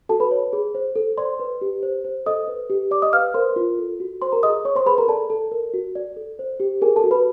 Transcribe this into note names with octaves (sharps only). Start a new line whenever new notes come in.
F#4 A4 A5
B4 B5
C#5
G#4
C5
A4
C5 D5 C6
B4
G4
C5
C5
A4 D#5 D#6
B4
G4
D5 D6
D#5 D#6
B4 F5 F6
A#4 C5 C6
F4
A4
F#4
C5 C6
A#4 A#5
G#4 D#5 D#6
C#5 C#6
C5 C6
G#4 B4 B5
A#4 A#5
A4 D5 A5
A4
A#4
F#4
D5
A4
C5
G4
G#4 A#4 G#5
A4 A5
F#4
B4 B5